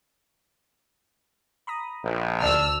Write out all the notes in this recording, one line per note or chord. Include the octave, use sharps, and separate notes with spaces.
A#5 B5 D#6
A#1
D2 D5 A5 E6 F6